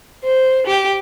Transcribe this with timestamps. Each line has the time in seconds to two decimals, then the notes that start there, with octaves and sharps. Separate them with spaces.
0.23 C5
0.66 G4